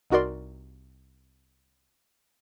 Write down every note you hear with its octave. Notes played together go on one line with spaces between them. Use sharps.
C2 D#4 F#4 A#4 D5 C6